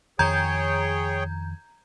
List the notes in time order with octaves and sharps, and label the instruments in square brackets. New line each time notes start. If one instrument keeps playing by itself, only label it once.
[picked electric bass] F2 D#3 [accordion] G#4 C#5 G5 [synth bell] A#5 G6 G#6